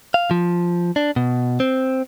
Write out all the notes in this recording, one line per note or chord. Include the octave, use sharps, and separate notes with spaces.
F5
F3
D4
B2
C4